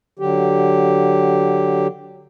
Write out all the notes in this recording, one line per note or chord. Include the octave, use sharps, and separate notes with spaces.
D3 F#3 G4